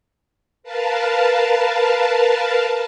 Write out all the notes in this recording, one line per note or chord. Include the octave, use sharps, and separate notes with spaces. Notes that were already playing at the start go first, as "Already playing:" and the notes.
A#4 B4 F5 A5